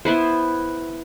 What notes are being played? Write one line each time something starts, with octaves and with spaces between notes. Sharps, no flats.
B3 E4 B4 C5